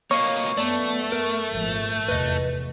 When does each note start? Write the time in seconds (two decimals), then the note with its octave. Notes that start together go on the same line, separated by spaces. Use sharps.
0.11 B2 A#3 C#5 D#5 F5 C#6
0.57 F#2 A3 B3 D5 A5
1.12 A#4
1.52 G#1 A#2 F3
2.08 F1 E2 B4 D#5